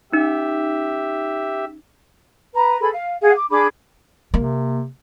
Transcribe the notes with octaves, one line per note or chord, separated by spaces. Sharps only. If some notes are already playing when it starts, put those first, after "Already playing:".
C#4 D#4 G4 E5
B4 A#5
G#4 A4 B4 B5
F5
G#4 F5 F#5
D6
D4 G#4 B5 D6
C3 A#3